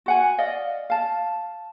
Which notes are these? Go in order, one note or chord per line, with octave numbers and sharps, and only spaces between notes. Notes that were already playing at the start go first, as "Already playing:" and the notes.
F#4 F#5 G#5
D5 D#5 F5
F5 A5